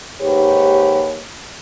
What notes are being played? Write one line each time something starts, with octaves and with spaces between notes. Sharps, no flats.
D#2 G#2 G4 B4 C#5